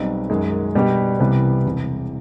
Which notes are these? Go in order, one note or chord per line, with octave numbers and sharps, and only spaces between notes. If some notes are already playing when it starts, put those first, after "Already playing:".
Already playing: B1 B2 G3 C4
F#2 D#3 G#3
B2 G3 B3 D4 G4
C2 C3 E3 G3 B3
E1 E2 C3